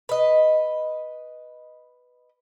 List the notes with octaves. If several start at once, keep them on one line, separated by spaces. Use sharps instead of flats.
B4 D#5